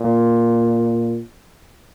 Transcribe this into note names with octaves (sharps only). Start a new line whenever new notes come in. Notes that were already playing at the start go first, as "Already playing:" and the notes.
Already playing: A#2